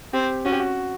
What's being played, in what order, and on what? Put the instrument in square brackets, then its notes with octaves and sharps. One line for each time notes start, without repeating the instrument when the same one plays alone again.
[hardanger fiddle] C4 [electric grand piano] G4
[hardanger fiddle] C#4 [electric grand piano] F#4
[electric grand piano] G4
F#4